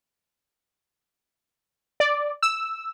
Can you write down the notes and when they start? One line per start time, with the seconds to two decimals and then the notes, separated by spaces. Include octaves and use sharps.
2.00 D5
2.43 E6